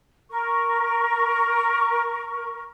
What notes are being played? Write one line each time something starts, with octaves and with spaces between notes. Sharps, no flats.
A#4 C#6